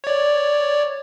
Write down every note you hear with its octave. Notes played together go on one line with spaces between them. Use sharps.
C#5 D5